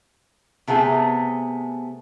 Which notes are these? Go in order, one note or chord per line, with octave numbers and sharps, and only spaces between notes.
C3 A3 B3 G#4